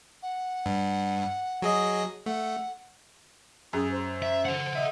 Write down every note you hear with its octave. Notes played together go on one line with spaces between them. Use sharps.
F#5
G2
F#3 G#4 D#5
A3 F#5
F#2 G#4
C5
E5
A4 F#5
D#5 E5